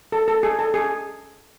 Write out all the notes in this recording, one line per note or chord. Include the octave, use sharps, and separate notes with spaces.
A4
A4
G#4
A4
G#4